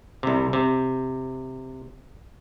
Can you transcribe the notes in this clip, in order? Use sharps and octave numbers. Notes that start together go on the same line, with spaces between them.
C2 C3
C3